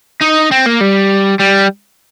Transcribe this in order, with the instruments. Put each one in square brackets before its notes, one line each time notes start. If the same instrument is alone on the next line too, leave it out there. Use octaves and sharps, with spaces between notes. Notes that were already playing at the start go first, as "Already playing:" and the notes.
[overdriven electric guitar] D#4
C4
A#3
G3
G3